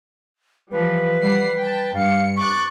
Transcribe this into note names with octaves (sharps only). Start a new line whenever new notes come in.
E3 F3 G3 B4
G3 F#5 C7
G5 A5
G2 F5 C#7
C#6 D6 F#6 A6